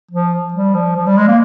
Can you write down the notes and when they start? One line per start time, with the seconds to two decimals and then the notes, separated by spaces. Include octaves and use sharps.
0.11 F3
0.53 G3
0.75 F3
0.96 F3
1.06 G3
1.17 G#3
1.28 A#3